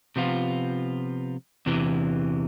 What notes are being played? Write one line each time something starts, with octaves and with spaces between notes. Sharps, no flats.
C3 F3 B3 F4
E2 C3 E3